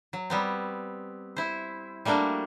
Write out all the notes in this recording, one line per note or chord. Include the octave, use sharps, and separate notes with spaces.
F#3
G3 B3 C4
E4 C5
G3 A3 A#3 D4 F#4